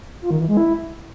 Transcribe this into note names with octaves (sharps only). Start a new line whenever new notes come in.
F4
D#3
E3
G#3
E4